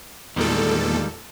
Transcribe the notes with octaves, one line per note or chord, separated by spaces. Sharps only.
E2 A#2 D#3 G3 G#3 A4